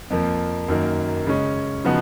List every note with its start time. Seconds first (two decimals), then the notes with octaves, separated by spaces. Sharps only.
0.10 F2 F3 A#3
0.68 F#2 D#3 A#3
1.26 C#3 G#3 C#4
1.84 C#3 F3 B3 D#4 F#4